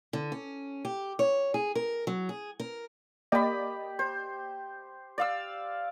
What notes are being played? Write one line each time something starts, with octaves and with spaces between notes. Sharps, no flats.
D3
C#4
G4
C#5
G#4
A#4
F#3
G#4
A#4
A#3 G4 D5 D#5 B5
C5
D5 F5 E6